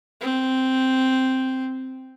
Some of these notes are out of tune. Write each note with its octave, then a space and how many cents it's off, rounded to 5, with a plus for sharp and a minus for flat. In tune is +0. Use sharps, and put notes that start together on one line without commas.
C4 -5